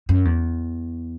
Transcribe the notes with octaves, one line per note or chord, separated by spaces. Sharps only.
F#2
E2